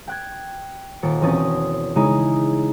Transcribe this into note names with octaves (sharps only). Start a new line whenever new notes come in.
G5 F#6 G#6
D#1 A6 C#7 D7
E1 C4 C#4 D#6 A6
C#3 G#3 D#4 E4 G#4